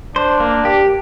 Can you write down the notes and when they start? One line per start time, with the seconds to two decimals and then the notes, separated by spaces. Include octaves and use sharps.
0.16 D4 C5
0.40 A#3
0.65 G4